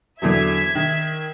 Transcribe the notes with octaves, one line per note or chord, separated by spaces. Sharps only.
E2 D3 F#3 E5 G#6
D#3